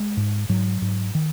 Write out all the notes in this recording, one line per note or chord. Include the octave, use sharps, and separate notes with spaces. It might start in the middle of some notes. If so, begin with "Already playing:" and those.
Already playing: G#3
G#2
G#2 F#3
G#2
D#3